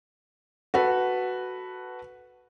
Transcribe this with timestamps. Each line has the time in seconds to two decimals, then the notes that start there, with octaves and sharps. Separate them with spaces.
0.74 F#4 A4 B4